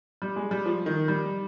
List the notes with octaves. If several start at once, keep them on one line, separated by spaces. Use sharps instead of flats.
G3
G#3
G3
F3
D#3
G3